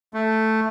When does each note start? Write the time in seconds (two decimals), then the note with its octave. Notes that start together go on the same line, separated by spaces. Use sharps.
0.14 A3